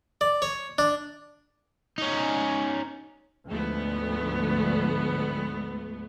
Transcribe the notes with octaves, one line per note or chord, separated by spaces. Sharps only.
D5
C#5
D4
C#4 D#4
D2 G#2 F3 A3 B3